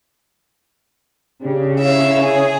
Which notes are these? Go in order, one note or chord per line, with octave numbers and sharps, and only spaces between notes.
C#3 D4 G4
E4 C#5 E5 F5
G#4